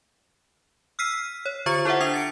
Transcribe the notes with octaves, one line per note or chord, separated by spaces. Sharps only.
E6 F6 B6 C7 D#7
C#5
D3 F4 C5 C#6 A6 C#7
E4 A4 C5 E5 F#5
D4 D#6 G#6 C7 F7
A6 C#7 D7